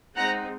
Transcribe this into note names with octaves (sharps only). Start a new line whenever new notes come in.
G#3 C4 D#4 F#5 A#5